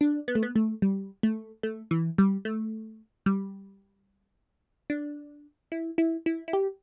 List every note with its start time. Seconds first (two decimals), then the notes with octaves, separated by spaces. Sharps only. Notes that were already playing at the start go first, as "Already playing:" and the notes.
0.01 D4
0.28 B3
0.35 A3
0.43 B3
0.56 A3
0.82 G3
1.23 A3
1.63 A3
1.91 E3
2.18 G3
2.45 A3
3.26 G3
4.90 D4
5.72 E4
5.98 E4
6.26 E4
6.48 E4
6.53 G4